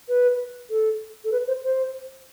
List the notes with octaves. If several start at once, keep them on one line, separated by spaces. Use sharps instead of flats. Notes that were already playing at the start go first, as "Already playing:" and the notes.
B4
A4
A4
B4
C5
C5